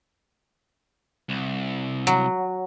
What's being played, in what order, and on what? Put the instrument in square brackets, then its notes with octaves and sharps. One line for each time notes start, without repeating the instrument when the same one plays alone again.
[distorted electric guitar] C2
[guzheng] F#3